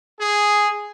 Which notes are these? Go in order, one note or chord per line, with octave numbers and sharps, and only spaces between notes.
G#4